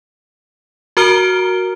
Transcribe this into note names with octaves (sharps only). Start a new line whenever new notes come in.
F#4 A#4 A#5 F6 D7 G7